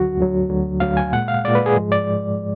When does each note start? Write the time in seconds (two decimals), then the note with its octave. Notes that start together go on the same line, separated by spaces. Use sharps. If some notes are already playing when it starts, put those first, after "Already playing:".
Already playing: D2 D3 F#3 F#4
0.18 D2 D3 F#3
0.49 D2 D3 F#3
0.80 D2 D3 F#3 F5
0.97 G#5
1.13 A#2 G#3 F#5
1.28 F5
1.44 A#2 G#3 D5
1.55 B4
1.66 G#4
1.76 G#2 F3 G#3
1.92 D5